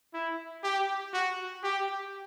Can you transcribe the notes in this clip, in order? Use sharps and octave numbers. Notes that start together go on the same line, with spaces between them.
E4
G4
F#4
G4